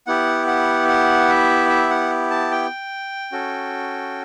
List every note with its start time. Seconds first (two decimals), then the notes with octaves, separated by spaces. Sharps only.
0.07 B3 E4 G4 F#5
0.47 F#5
0.88 F#5
1.29 E5
1.69 E5
1.90 F#5
2.31 A5
2.51 G5
3.32 C#4 F#4 A4